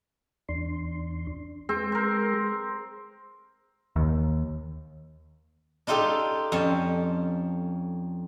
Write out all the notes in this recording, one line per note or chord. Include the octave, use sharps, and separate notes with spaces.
E2 D4 C6
G#3 C4 G#4
A#4 C5
D#2
D4 D#4 F4 G4 A4
F2 C#4 A5